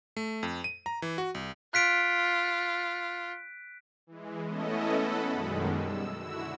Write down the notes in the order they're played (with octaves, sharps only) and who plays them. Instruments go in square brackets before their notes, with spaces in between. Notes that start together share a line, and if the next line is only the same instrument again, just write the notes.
[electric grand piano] A3
F2
D#7
A#5
E3
F#4
C2
[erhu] F4 [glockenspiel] F#6 B6 D7
[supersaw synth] E3 G#3
A3 B3 C#4 E4 A4 D#5
A4 B4 F#5 B5
F#2 B2 D#3 G3 G#3
E6
D3 E4 F#4 E6